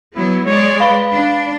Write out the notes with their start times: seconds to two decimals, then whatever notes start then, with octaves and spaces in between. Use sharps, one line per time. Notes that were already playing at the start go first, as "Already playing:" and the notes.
0.15 F#3 B3 E4
0.46 G#3 C#5 D5
0.80 B4 F5 B5 G7
1.12 D4